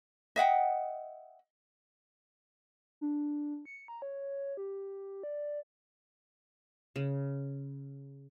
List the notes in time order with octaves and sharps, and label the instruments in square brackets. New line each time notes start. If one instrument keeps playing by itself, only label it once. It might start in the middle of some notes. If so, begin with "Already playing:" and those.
[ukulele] D#5 E5 F#5 G5
[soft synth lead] D4
C#7
A#5
C#5
G4
D5
[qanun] C#3